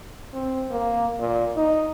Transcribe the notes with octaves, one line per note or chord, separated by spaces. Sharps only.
C4
A#3
A#2
D#4